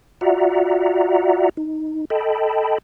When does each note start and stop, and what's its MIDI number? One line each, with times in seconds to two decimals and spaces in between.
0.21 1.49 65
0.21 1.49 66
0.21 1.49 74
0.21 1.49 76
0.21 1.49 78
0.21 1.49 82
1.57 2.05 63
2.10 2.78 69
2.10 2.78 75
2.10 2.78 79
2.10 2.78 81
2.10 2.78 83